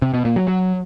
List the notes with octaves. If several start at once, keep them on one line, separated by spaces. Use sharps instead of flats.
C3
B2
A#2
F#3
F#3